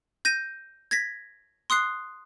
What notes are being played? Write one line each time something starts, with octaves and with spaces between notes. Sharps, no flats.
G6 A#6 D#7
G#6 A#6 B6
C6 D#6 F#6 C7